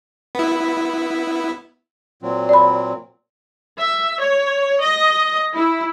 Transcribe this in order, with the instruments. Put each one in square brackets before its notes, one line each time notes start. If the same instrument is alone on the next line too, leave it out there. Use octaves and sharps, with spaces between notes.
[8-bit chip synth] B3 E4
[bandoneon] A#2 F#3 C4
[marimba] D5 B5
[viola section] E5
C#5
D#5
E4